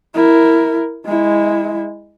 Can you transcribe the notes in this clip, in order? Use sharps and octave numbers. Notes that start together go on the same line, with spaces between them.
E4 A#4
G#3 E4